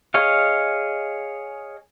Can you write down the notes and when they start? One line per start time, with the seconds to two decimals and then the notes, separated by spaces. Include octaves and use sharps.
0.14 G#4 C#5 D#5 F5